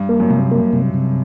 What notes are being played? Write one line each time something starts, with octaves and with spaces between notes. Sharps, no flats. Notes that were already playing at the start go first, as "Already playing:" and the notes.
Already playing: G2
A#3
F#2
G2 C3
A#3
C3
C3